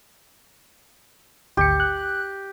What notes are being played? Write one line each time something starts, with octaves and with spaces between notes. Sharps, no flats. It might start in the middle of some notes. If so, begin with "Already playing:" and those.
G#1 D2 G4 C#7
F#6